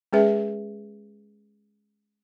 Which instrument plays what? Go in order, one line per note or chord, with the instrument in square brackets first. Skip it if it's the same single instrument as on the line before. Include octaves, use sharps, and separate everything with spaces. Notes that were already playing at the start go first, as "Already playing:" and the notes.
[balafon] G#3 C#4 G#4 B4 E5